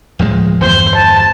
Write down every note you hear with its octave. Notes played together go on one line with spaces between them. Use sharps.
D1 F3 G#3
G1 E2 C5
A5